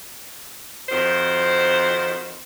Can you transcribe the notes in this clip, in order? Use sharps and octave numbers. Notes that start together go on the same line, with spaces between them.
F2 D#3 F#4 C5